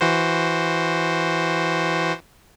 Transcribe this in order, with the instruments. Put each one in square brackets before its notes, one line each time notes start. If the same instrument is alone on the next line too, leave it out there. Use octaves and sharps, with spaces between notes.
[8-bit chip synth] E3 F#4 C5